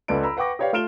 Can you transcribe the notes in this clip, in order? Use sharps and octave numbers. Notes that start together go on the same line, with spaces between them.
C#2 A4 B4 D5 D7
A#5 B5 E6
B4 F#5 G5 C#6 D6 A#6
G4 B4 C#5 D5 F5 G5
A3 F4 F6 D7 E7 G7